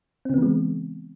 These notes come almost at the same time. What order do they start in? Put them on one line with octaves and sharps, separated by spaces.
C4 C#3 B3 E3 G#3